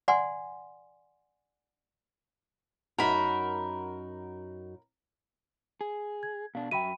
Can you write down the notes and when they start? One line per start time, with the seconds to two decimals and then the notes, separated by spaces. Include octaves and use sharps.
0.08 D5 F#5 G#5 C6
2.98 F#2 D#4 F#4 A#4 B5
5.81 G#4
6.23 G#6
6.55 B2 D4 F5
6.71 F#2 F#4 E5 G5 B5 D#7